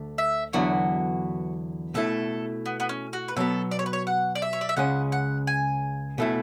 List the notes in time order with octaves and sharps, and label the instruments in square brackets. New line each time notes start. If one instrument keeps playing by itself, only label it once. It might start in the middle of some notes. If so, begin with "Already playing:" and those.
Already playing: [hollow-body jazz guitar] D2 D3 A3
[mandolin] E5
[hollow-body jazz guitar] E2 D3 F#3 B3 E4 [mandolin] F#4
[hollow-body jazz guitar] B2 A3 E4 [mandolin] A4
[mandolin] B3
B3
C#4
F#4
B4
[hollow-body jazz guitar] B2 F#3 B3 [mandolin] A4
[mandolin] D5
C#5
B4
C#5
F#5
D5
E5
C#5
D5
E5
[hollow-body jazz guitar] C#2 C#3 G#3 C#4 [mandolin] F#5
[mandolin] F#5
G#5
[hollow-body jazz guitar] B2 A3 E4